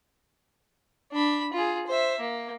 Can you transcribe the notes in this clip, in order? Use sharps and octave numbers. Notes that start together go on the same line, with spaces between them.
D4 B5
F4 G#4
C5 E5
A#3